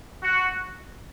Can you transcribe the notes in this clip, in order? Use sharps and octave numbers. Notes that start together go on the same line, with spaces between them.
F#4